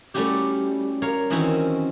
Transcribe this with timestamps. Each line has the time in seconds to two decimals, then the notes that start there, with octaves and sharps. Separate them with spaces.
0.14 G3 A3 C#4 E4 F#4 G4
1.02 A#4 C#5 F5
1.30 D#3 E3 C4 C#4 E4 F#4